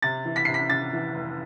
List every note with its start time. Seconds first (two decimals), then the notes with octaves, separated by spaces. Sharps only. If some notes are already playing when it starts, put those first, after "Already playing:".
0.02 C3 A6
0.25 E3
0.36 B6
0.45 C3 C7
0.54 B6
0.70 C3 A6
0.93 E3
1.14 F1